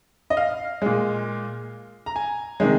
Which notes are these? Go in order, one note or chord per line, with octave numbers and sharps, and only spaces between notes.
D#5
F5
A#2 G#3
A#5
G#5
C3 D#3 G#3